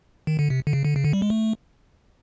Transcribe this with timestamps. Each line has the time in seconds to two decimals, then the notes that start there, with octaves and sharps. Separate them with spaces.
0.27 D#3
0.39 D3
0.50 C3
0.67 D3
0.73 C#3
0.85 D3
0.96 C#3
1.05 D3
1.13 G3
1.22 G#3
1.30 A3